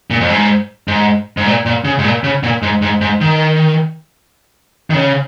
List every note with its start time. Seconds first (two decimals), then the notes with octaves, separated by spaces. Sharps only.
0.11 A#2
0.21 F2
0.30 G#2
0.88 G#2
1.37 G#2
1.46 A#2
1.66 A#2
1.85 C#3
1.99 G#2
2.04 A#2
2.24 C#3
2.43 A#2
2.62 G#2
2.82 G#2
3.01 G#2
3.21 D#3
4.90 D#3
4.94 C#3